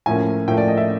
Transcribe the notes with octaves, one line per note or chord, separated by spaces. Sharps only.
A2 F3 A#3 C#4 G#5
A2 F3 A#3 C#4 G5
D5
D#5
E5